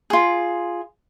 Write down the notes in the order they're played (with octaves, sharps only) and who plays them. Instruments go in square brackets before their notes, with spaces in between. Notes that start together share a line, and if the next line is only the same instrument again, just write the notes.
[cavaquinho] F4 G#4